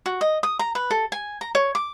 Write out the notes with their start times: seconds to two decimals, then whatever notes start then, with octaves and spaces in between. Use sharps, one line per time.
0.06 F#4
0.21 D#5
0.43 D#6
0.59 A#5
0.75 B4
0.91 A4
1.12 G#5
1.41 A#5
1.55 C#5
1.75 D6